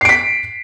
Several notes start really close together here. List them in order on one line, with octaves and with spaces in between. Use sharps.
C7 D7 B6